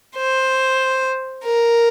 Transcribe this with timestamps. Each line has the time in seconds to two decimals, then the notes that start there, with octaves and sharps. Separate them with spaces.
0.16 C5
1.45 A#4